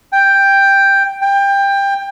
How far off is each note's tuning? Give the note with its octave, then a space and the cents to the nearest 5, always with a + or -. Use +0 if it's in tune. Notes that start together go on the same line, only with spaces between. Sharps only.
G5 +5
G5 +20